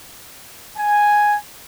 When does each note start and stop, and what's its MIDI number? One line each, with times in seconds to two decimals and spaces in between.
0.78 1.37 80